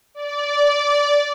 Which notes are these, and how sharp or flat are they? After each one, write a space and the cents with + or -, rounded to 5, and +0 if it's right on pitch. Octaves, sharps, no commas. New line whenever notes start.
D5 -15